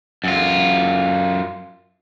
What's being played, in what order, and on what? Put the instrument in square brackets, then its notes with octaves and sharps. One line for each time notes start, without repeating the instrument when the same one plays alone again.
[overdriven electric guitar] F#2 F4